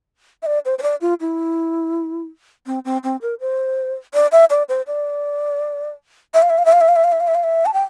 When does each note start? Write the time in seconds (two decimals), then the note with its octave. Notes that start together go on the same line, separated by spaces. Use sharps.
0.42 E5
0.46 D5
0.65 C5
0.78 C5
0.83 D5
1.01 F4
1.20 E4
2.66 C4
2.85 C4
3.03 C4
3.21 A#4
3.40 C5
4.14 D5
4.32 E5
4.50 D5
4.69 C5
4.87 D5
6.34 E5
6.42 F5
6.50 E5
6.58 F5
6.65 E5
6.73 F5
6.81 E5
6.88 F5
6.96 E5
7.04 F5
7.12 E5
7.20 F5
7.27 E5
7.35 F5
7.43 E5
7.66 A5
7.74 G5